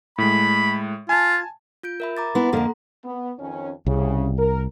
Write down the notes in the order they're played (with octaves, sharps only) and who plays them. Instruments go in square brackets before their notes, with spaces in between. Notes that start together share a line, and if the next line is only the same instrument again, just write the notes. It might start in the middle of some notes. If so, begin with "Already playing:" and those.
[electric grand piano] A2 G#3 [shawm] B5
[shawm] F4 [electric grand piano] G#5 A5
[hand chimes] F4 G6 D7
A#4 E5 B5
A#5 D6 A6
[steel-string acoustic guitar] B3 E4 [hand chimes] F#5 C6
[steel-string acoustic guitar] F2 D3 A#3 [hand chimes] A4 A#5
[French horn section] B3
F2 D#3 C#4
[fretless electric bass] C2 [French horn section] C#3
[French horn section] A#4